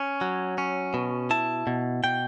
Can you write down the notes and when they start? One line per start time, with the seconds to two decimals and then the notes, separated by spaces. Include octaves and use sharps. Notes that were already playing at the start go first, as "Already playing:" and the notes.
Already playing: C#4
0.21 F#3
0.58 C#4
0.94 B2
1.31 E4 A5
1.67 B2
2.04 B2 G5